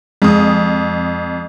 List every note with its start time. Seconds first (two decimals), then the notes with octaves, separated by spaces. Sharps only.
0.22 F2 G#3 D#6